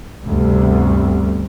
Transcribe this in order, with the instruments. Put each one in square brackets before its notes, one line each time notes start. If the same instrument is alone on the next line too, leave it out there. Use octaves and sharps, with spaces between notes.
[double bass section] G1 D2 C3 G3